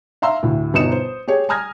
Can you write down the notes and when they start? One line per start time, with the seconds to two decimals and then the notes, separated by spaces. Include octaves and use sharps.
0.22 E5 F5 A#5 C6 E6
0.43 D2 A2
0.74 G1 B2 D#4 D#6 C#7 E7
0.92 C5
1.28 G4 G#4 C#5
1.49 G#5 A#5 D#6 F6 G#6 A#6